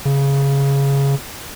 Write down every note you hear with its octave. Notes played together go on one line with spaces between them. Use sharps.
C#3